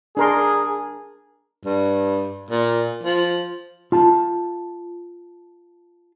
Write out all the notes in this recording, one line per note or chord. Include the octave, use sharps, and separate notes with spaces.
D4 G#4 A#4 C6
G2
A#2
F3
F4 A5